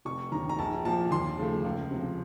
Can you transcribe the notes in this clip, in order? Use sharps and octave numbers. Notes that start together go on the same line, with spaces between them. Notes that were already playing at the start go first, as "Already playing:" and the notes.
F1 C#6
D#2 D#3 A#5
A#5
A#1 A5
A#2 F3 A5
D#2 C6
C#3 F3 A3
C#2
C3 F3